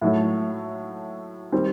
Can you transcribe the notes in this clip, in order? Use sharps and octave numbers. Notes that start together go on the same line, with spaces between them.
A2 F#3 A3 E4
D#3 G3 C4